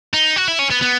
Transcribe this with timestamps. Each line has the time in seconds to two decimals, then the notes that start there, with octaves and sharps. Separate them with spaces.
0.14 D#4
0.36 F#4
0.48 E4
0.59 C#4
0.71 B3
0.82 B3